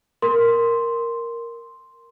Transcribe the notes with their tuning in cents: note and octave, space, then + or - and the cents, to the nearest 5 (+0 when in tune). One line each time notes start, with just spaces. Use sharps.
A#4 +0 C6 +0